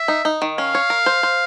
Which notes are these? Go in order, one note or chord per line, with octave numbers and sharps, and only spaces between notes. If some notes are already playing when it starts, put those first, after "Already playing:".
Already playing: E5
D#4
D#4
D#3
C#4 F5
C#5
A#4
C5
C5